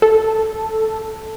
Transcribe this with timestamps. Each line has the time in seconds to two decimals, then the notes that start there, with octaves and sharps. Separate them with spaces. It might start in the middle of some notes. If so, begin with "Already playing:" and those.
0.02 A4